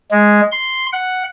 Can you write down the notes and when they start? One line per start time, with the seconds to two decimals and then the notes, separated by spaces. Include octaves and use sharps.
0.11 G#3
0.52 C6
0.93 F#5